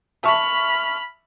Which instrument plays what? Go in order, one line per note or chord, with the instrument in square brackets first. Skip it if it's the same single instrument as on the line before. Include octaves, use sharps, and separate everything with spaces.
[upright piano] E5 A5 C#6 [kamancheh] B5 F6